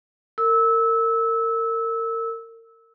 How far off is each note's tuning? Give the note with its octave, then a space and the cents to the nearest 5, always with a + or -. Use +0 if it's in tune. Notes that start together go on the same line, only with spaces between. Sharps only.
A#4 -35 E6 -20